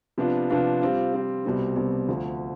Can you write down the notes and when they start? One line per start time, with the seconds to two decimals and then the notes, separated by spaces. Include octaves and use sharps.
0.18 C3 F3 B3 D4 F4
0.50 C3 F3 B3 D4 F4
0.81 G3 C4 F4
1.13 G3 C4 F4
1.45 C2 B2 G3 C4
1.76 C2 B2 G3 C4
2.08 D2 D3 F3